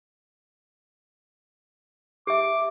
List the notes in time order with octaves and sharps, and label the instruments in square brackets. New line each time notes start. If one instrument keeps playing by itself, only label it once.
[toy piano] G4 E5 [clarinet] D6